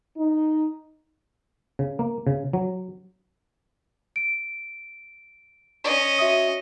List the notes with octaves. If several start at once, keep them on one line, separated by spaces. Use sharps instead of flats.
D#4
C#3
A#3
C#3
F#3
D7
C#4 D#5
F#4 E5 D#6